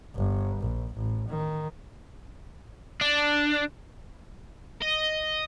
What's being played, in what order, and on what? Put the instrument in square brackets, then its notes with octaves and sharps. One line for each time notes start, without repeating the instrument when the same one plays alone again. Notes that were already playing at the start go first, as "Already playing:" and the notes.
[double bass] G1
A#1
A1
D#3
[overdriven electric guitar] D4
[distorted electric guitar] D#5